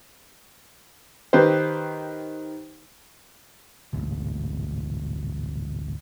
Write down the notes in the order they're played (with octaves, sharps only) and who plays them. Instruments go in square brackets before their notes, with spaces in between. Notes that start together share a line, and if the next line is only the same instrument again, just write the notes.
[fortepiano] D#3 D#4 G4 B4 C5
[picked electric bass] D1 G#1 D2